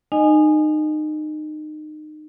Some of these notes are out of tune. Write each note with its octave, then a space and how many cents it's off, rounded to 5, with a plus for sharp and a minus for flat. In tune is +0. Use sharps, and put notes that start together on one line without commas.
D#4 -25 D#5 -15 G#5 +0